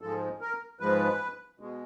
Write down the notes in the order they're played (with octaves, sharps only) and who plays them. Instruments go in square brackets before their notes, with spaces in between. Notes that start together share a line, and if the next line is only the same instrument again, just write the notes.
[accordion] G#2 F3 G#3 A4
A#4
G#2 F3 G#3 B4
B2 G#3